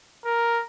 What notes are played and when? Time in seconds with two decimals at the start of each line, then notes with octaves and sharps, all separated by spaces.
0.25 A#4